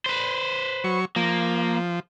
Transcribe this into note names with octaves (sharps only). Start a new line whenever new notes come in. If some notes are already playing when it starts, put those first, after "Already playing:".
B4 C5
F#3 C#6
F3 A#3